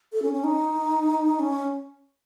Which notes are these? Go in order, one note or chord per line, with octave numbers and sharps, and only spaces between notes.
A4
C#4
C#4
D#4
C#4